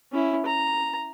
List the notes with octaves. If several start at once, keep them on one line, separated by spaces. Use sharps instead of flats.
C#4 E4
A#5